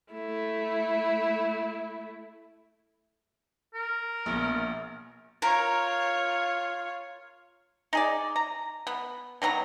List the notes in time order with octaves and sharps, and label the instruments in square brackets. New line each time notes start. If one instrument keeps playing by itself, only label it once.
[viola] A3 E4
[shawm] A#4
[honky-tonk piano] A#1 B2
[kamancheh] F4 C#5 [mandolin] A#4
[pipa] D#4 G#4 D5
A#5
B3
B2 D#3 F#3 A#5